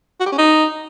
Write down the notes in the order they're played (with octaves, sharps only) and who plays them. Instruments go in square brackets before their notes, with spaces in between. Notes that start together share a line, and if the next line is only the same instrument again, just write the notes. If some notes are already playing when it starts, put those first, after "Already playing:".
[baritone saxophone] F#4
G4
C#4
D#4